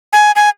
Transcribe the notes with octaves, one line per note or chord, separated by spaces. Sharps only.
G#5
G#5